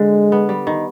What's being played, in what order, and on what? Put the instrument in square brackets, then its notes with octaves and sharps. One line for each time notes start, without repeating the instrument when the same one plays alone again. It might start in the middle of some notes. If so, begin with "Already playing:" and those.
Already playing: [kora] D3 [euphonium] G#3
[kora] B3
G3
D#3